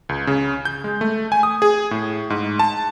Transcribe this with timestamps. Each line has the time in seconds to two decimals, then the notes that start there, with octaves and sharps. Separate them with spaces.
0.09 C#2
0.27 C#3
0.65 G6
0.84 G#3
1.01 A3
1.32 G#5
1.43 D#6
1.62 G#4
1.91 A2
2.30 G#2
2.59 A5